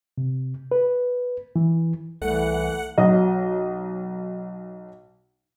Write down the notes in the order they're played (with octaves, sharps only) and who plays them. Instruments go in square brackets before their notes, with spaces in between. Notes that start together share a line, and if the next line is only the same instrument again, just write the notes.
[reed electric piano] C3
B4
E3
[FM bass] C2 [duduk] E3 [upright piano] A3 [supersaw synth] F#5
[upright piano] B1 F#3 D#5